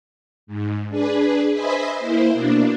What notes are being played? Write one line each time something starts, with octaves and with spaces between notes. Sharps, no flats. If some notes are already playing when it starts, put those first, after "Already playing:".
G#2
D4 G#4 B4
B4 C5 D#5 E5 G#5 B5
A#3 E4 C5
B2 A#3 D4